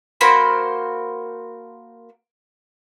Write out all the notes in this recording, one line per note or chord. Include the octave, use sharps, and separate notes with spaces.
A#3 F#4 C5 B5